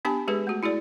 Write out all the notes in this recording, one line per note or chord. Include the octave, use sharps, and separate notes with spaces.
B3 D4 G4 G#5 A5
G#3 G4 G#4 B4
A3 F#4
E4 F#4 G#4 D5